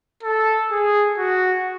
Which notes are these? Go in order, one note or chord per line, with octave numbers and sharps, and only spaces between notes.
A4
G#4
F#4